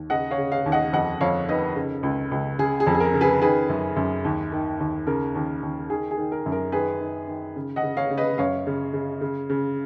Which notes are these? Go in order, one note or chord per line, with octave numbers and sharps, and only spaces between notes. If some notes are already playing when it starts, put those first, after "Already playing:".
Already playing: D#2
C#3 D#5 F#5
C#5 F5
C#3
C#5 F5
D#2
D#5 F#5
F2 D#5 F#5
F2 C#5 F5
D#3 B4 D#5
C#3
C#2
C#2
C#3 G#4
G#4
F2
G#4
A#4
C#3
G#4 B4
D#3 G#4 B4
F#2
F#2
D#2
D#3
D#2
C#3 A#4
D#2
D#2
D#3 G#4
G#4
D#3
A#4
F#2
A#4
D#3 G#4 B4
D#3
D#3
C#3
D#5 F#5
C#3
C#5 F5
C#3
B4 D#5
F#2 C#5 F5
C#3
C#3
C#3
C#3